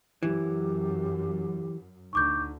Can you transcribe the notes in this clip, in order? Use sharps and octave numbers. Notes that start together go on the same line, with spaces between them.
F#2 E3 G4
D2 D3 D#4 C#6 D6 G6